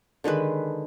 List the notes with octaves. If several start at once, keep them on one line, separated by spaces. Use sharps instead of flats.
D3 D#3 G#3 B4